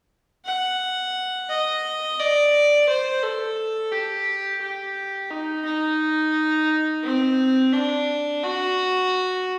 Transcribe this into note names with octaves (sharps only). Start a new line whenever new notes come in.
F#5
D#5
D5
C5
A4
G4
G4
D#4
D#4
C4
D4
F#4